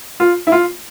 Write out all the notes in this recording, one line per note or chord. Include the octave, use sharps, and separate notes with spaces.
F4
E4
F4